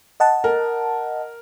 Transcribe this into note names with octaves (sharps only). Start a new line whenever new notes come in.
D#5 F#5 A5
A#4